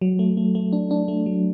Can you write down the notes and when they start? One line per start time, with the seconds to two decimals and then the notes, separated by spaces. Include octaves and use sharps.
0.01 F#3
0.19 A3
0.37 A3
0.55 A3
0.73 D4
0.91 D4
1.08 A3
1.26 F#3